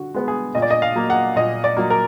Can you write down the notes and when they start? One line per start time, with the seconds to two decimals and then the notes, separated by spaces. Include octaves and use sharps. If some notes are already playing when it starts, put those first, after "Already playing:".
Already playing: D3 F#4
0.15 G#3 B3
0.28 G#4
0.55 A#2 D#5
0.62 D5
0.70 D#5
0.82 F5
0.96 F#3 A#3
1.10 F#5
1.36 A#2 D#5
1.64 D5
1.77 F#3 A#3
1.90 A#4